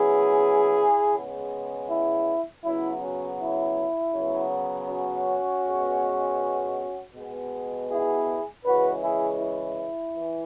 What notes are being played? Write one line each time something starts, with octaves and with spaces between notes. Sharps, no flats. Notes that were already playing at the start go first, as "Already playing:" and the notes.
Already playing: C#3 F#3 B3 E4 G#4
C#3 G#3 B3
E4
C#3 F#3 B3 E4
C#4 F#4
E4
C#3 F#3 B3
C#4 F#4
B2 G#3 B3
B2 G#3 B3
E4 G#4
C#3 E3 G#3 F#4 B4
E4 G#4
E4
E3